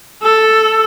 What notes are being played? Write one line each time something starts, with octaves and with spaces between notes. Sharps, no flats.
A4